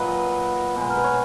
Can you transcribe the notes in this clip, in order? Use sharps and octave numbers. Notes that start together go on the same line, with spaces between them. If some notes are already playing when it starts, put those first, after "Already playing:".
Already playing: A#2 F#3 B4 D#5
B2 G#3
A#4
B4
C#5